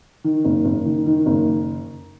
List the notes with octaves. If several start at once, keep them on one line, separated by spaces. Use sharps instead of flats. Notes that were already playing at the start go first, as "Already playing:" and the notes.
D#3
F#1
F#1
D#3
D#3
F#1